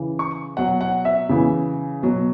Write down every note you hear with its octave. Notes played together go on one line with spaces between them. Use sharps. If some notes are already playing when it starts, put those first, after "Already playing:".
Already playing: C#3 E3
C#6
B2 F#3 F#5
F#5
E5
C#3 E3
B2 F#3